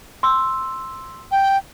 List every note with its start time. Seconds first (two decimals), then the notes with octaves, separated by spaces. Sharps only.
0.23 C6 E6
1.32 G5